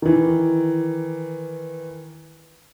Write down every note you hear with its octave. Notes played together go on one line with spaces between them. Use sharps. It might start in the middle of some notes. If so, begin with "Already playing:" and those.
D#3 E3